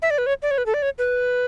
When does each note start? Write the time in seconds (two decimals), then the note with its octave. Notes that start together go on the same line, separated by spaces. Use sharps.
0.02 E5
0.10 D5
0.18 B4
0.26 C#5
0.42 D5
0.51 C#5
0.58 B4
0.66 A4
0.74 D5
0.82 C#5
0.98 B4